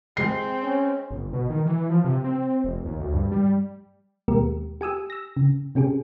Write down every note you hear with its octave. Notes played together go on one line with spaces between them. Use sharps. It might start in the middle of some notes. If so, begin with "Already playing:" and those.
G#3 C4 C7
C#4
G1
B2
D#3
E3
F3
C3
C4
F1
D#2
D2
G2
G3
D#2 B2 G#3 A#3 G4 A#4
G4 G#5 D#6 E6
E6 A#6
C#3
C3 C#4 G4 G#4